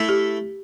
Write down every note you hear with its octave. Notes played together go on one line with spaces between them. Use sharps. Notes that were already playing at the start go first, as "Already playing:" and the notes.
Already playing: A3 E4 A4
G4